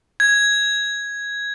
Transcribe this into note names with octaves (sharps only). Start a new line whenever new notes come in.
G#6